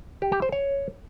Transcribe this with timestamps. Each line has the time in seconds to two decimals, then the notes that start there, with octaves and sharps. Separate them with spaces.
0.22 G4
0.32 G4
0.42 C5
0.52 C#5